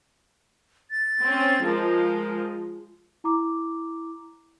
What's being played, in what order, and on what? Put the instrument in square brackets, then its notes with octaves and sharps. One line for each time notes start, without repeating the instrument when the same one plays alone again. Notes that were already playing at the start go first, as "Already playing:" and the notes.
[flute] A6
[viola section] C4 C#4
[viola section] F3 G#3 [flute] A#4
[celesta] E4 A#5 D6